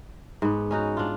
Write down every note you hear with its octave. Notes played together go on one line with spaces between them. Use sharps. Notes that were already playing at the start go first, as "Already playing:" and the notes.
G#2 B3
C#4 D#4 F#4
D4 F4